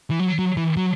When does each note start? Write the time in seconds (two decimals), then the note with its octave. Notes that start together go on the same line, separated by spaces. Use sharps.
0.11 E3
0.19 F#3
0.39 F#3
0.57 E3
0.77 F#3